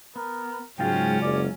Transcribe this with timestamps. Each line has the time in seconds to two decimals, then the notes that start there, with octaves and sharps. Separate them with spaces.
0.16 B3 A#4
0.79 G#2 C#3 F#3 G#3 C#4 F4 G5
1.22 F#1 D5